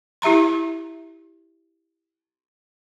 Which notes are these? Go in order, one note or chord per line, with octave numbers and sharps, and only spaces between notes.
E4 G4 E5 A#5 C6